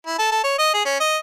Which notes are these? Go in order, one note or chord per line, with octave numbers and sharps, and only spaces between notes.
E4
A4
A4
C#5
D#5
G#4
C#4
D#5